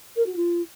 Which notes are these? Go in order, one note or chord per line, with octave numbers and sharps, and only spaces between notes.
A#4
F#4
F4